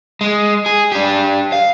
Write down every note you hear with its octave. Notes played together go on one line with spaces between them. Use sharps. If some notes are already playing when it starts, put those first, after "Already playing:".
G#3
G#4
D4 G4
F5